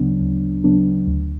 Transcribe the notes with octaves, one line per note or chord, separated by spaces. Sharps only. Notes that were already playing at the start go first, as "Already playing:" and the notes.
Already playing: D2 C#3 F#3 B3 D4
D2
C#3 F#3 B3 D4
D2